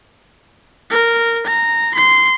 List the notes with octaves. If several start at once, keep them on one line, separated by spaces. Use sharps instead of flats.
A#4
A#5
C6